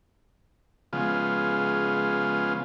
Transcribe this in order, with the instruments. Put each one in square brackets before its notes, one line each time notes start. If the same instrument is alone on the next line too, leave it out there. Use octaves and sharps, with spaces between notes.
[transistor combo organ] C#3 F3 G#3 B3 F4